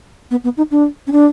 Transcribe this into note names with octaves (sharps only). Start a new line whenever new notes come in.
B3
B3
D#4
D4
C#4
D4